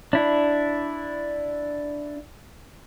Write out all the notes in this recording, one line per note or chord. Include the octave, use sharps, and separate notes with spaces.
D4 E4